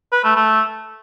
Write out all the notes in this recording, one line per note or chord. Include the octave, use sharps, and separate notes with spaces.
B4
A3
A3